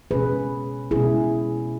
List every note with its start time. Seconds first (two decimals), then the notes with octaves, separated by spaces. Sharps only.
0.11 B2 G#3 C#4 G#4 B4
0.91 B2 G#3 C#4 E4 G#4